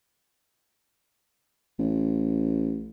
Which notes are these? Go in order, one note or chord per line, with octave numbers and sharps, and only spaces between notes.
A1